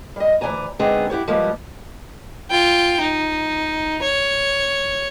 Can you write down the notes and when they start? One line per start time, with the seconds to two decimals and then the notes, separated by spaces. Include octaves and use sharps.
0.16 G3 D#5
0.41 D2 E3 G#3 D5 G#5 A#5
0.79 D3 G#3 B3 C4 D#4 G#4
1.10 E4 F#4 G4 C#5
1.28 F3 G3 G#3 A#3 B3
2.50 F4 G5
3.00 D#4
4.02 C#5